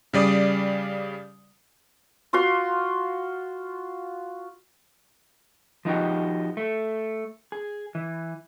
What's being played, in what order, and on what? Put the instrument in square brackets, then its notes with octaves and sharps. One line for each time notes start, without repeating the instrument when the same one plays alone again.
[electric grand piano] C#3 G3 D5 D#6
[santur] F4 F#4 F5 C6
[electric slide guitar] F3 D#4 F#4 G4
A3
G#4
E3